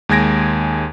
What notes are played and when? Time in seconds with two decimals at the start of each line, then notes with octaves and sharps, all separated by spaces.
0.09 D#2 G#3 G#5 G#6 A#6 D7